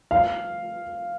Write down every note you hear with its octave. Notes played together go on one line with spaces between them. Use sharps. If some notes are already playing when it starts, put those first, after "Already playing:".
F5